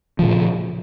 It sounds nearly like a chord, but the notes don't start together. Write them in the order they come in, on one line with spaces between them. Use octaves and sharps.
F3 C#3 A#2